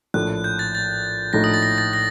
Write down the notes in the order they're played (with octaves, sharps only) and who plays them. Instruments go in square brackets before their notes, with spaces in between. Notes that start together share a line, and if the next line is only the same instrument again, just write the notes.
[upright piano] A#1 A2 A3 [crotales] F#6
[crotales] G6
A6
A6
[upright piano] A#1 A2 A3 D#4 [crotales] A#6
[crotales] D#6
A6
A#6
A6
A#6